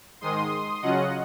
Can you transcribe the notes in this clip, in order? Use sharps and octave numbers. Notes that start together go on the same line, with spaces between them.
G#2 D#3 G#3 C6 D#6
C#3 F#3 C#4 F4 D#5 F#5